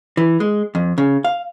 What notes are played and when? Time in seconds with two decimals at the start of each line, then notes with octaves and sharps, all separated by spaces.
0.17 E3
0.40 G#3
0.75 F2
0.98 C#3
1.25 F5